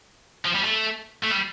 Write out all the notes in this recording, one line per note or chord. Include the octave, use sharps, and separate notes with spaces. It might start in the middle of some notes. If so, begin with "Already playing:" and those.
F3
G3
A3
A3
G3